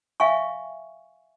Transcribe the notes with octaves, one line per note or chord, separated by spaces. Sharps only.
E5 F5 G5 G#5 C#6